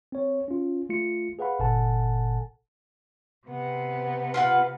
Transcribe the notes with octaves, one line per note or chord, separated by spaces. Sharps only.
C4 C#5
C#4 F4
A3 F4 C#7
G#4 B4 F5 F#5 B5
G1 A#2 A4 F#5 G#5 A5
C3 B3
F4 B4 F#5